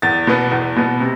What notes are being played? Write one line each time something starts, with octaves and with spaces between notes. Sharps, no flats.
E2 A6
B2 B3
E2
B2 B3
C3